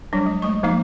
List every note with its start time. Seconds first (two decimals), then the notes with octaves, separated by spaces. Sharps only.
0.13 F#3 G3 D4
0.26 G#3
0.42 G#3 A3 C#6
0.63 F3 A#3 D#4 F5 D6